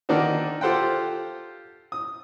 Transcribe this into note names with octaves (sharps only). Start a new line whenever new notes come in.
D3 D#3 A#3 D4 F#4
F4 G4 A4 C5 F#5 G5
D#6